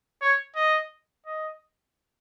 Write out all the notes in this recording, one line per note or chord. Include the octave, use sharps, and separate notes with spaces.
C#5
D#5
D#5